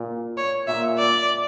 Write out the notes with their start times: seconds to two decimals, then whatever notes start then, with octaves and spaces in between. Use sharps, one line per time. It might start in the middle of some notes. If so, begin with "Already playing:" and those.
Already playing: A#2
0.37 C#5
0.68 A#2 E5
0.98 D5